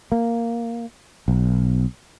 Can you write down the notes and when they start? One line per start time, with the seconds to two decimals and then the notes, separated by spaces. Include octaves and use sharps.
0.12 A#3
1.28 B1